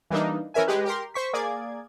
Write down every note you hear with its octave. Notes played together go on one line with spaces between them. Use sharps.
E3 G3 A#3 D4 D#4
E3 C#4 A#4 E5 G#5
G#3 G4 B4
G4 A#4 C6
C5 C#6 B6
A#3 G#4 D5 D6 G#6